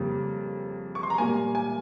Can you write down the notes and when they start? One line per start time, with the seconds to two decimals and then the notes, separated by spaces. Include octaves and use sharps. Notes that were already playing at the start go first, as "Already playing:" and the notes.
Already playing: F2 C#3 G3 A#3
0.95 C#6
1.03 C6
1.10 A#5
1.18 A#2 G3 A#3 G#5
1.55 G#5